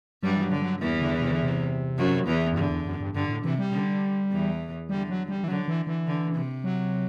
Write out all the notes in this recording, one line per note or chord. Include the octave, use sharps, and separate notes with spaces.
G2 F#3 G3
E3
F#3
D3
F#3
E2 E3
D3
C3
D3
C3
F#2 F#3
E2 E3
F#2
G2 D3
E2
F#2
G2
G2 D3
A2
C3 E3
G3
D3
E2 E3
D3 G3
F#3
G3
E3
D3 F#3
E3
E3
D3
C3
F#3